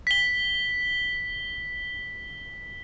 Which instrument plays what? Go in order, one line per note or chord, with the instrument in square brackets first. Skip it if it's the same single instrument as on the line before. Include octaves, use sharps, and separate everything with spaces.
[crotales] B6 G7